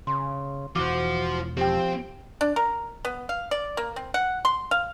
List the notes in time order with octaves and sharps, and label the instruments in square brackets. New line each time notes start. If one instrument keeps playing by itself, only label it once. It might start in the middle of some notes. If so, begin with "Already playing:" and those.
[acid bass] C#3 [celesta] C6
[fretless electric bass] E1 E3 [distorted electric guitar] F4 C5 [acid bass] F#4 [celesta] D6
[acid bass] F3 [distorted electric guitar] C4 [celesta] G4 G5
[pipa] D4
A#4
B3
F5
D5
A#3
C4
F#5
C6
F5